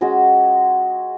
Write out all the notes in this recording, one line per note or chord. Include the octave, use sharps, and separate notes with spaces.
G#3 C#4 F#4